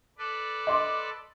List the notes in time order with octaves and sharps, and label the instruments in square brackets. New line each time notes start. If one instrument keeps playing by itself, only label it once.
[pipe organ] A4 B4 D5
[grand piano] D#5 C6 D6